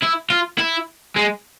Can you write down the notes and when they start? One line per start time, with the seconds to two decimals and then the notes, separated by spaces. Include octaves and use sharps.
0.02 E4
0.30 F4
0.59 E4
1.16 G#3